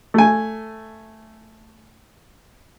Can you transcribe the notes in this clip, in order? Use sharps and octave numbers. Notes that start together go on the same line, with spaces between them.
A3 G#5